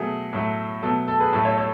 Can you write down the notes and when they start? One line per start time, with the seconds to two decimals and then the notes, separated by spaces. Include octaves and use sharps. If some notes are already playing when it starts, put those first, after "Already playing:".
Already playing: B2 F#3 A3 G#4
0.33 A2 F#3 A3
0.82 B2 F#3 A3 A4
1.08 A4
1.20 G#4 B4
1.33 A2 F#3 A3 A4
1.45 A4 C#5
1.58 A4 C#5